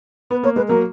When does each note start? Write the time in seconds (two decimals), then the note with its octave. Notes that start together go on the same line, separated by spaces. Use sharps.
0.31 B3 B4
0.43 A#3 C#5
0.56 G#3 B4
0.68 F#3 A#3 A#4